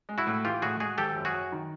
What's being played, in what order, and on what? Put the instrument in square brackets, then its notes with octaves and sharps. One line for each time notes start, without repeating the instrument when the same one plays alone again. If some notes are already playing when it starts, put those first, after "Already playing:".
[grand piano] G#3
[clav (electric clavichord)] E4 F#4
[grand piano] A2
[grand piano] E3 [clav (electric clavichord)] F4 G4
[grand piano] A2 [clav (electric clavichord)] F#4 G#4
[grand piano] G#3 [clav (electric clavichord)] F#4 G#4
[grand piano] G#1 [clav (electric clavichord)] G4 A4
[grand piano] F#2
[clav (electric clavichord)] F#4 G#4
[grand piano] F#3
D#3